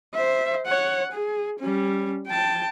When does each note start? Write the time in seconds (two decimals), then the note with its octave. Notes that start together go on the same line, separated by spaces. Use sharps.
0.14 C5 E5
0.66 C#5 F#5
1.12 G#4
1.59 G3 C#4
2.27 G5 A5